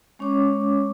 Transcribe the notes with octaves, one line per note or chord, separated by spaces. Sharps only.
G#3 C#4 C#5 D6